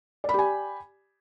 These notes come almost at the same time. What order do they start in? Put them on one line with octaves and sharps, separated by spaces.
D5 B5 G4 G#5